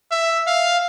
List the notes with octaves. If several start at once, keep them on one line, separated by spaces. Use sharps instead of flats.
E5
F5